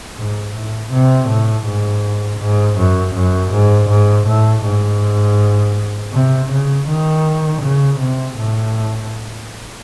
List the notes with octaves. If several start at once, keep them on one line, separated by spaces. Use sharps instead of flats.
G#2
A2
C3
A2
G#2
G#2
F#2
F#2
G#2
G#2
A2
G#2
C3
C#3
D#3
C#3
C3
A2